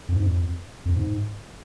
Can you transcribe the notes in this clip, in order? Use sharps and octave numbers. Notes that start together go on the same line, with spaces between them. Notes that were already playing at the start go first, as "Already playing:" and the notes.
F2
G#2
F2
F2
G#2